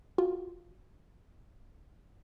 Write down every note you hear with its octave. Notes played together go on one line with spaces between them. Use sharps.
F4 F#4